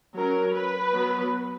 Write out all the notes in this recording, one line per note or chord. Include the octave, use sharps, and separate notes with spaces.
F#3 C#4 A#4
B4
F#3 B3